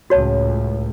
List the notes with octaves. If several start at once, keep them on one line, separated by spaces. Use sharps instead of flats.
C#2 A2 F#4 C#5 A5